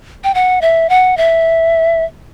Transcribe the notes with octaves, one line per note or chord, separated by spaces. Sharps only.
G5
F#5
E5
F#5
E5